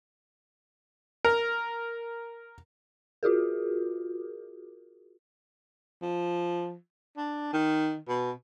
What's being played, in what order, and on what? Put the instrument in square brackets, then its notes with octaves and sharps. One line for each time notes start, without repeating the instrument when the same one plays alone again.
[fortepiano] A#4
[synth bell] F4 F#4 G#4 A#4
[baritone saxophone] F3
D4
D#3
B2